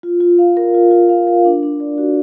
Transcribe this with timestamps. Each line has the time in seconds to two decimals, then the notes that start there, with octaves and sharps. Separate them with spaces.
0.03 F4
0.21 F4
0.38 F5
0.57 A#4
0.74 F4
0.91 F4
1.09 F5
1.27 A#4
1.45 D4
1.63 D4
1.80 D5
1.98 F#4